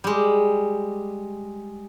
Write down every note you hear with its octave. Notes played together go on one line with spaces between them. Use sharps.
G3 G#3